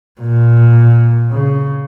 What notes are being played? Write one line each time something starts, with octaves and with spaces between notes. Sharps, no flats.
A#2
C#3